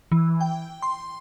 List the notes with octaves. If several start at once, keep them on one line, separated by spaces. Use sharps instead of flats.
E3
G5
C6